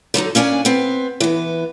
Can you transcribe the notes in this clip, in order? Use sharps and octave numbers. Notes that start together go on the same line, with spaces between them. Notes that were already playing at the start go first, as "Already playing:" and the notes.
D3 F#3 D#4 A4
A#3 C#4 D4 D5 G#5
B3 C4
E3 B3